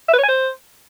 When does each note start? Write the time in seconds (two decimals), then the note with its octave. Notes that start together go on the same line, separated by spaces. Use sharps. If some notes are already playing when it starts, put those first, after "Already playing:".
0.08 E5
0.13 B4
0.18 C#5
0.23 G#5
0.28 C5